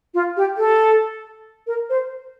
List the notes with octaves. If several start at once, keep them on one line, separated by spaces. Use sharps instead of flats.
F4
G4
A4
A#4
C5